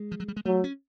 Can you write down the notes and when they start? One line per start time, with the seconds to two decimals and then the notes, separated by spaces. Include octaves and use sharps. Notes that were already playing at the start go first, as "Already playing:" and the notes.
Already playing: G#3
0.12 F3
0.20 F#3
0.28 G3
0.36 G#3
0.45 F#3 A3
0.64 C#4